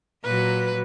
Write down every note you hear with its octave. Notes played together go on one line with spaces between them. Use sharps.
A#2 F#3 B4